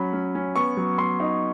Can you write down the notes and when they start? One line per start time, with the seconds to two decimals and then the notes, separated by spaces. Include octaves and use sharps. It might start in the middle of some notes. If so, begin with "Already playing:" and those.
Already playing: F#3 C#4 B5
0.13 C#4
0.35 C#4
0.56 B3 C#6
0.77 F#3
0.98 B3 C6
1.20 D#4